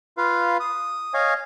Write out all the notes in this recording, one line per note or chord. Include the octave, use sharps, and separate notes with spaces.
F4 B4 F5
D#6
C#5 D#5 F5 G#5